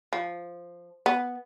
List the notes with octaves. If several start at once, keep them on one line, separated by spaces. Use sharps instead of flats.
F3
B3